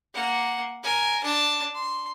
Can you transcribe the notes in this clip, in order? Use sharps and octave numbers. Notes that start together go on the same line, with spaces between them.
A#3 F#5
A#4 G#5
D4 A5
C6